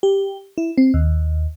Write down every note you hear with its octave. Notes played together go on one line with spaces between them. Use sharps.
G4
E4
C4
D#2